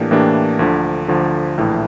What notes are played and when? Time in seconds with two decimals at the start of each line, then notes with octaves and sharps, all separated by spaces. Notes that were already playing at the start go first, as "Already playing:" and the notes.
Already playing: A2 E3 A#3 D4 G4
0.11 A2 E3 A#3 D4 G4
0.59 D2 D3 F3
1.08 D2 D3 F3
1.57 A#1 A2 E3